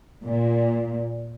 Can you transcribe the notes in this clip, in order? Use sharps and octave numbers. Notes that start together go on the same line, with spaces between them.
A#2